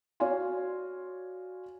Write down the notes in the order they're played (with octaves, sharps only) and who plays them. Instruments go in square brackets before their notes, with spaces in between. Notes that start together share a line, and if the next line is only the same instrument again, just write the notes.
[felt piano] F#4 C#5 D5 F5 G#5 C6